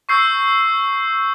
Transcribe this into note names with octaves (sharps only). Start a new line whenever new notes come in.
C#6 E6 G6 C7